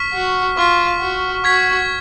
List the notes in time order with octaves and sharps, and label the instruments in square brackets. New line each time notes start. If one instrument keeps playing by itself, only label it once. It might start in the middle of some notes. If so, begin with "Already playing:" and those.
Already playing: [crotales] C#6 F6 B6
[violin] F#4
[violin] F4 [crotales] C#6 F6 B6
[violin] F#4
[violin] F#4 [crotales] C#6 G#6 B6